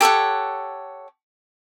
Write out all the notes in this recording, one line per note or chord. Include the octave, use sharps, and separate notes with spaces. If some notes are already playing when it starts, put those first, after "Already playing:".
G4 A4 C#5 F#5